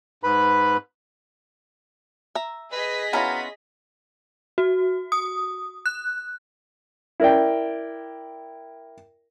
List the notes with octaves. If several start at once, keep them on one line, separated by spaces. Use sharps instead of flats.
G#2 B4 B5
E5 A#5
G#4 B4 D#5 B6
B2 B3 C#4 E4 F4 A#4
F#4
D#6
F#6
E4 A#4 D5 G5